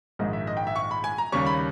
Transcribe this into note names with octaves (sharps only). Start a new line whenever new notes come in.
A#1 G#2 D#3 G#3 D#5
E5
D#5
G5
E5
C#6
B5
G#5
A#5
D#2 C#3 G3 C#4 C#6
B5